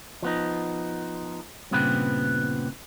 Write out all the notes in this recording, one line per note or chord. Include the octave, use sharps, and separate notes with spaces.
F3 B3 D#4
G2 A#2 C#3 B3 C4 B4